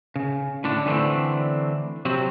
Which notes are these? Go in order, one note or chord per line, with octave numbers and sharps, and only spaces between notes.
C#3
A2 D3 D4
D3 E3 A3 C4 D4
C3 F#3 C4